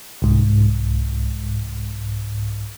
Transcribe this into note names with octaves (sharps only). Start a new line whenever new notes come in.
C2 G#2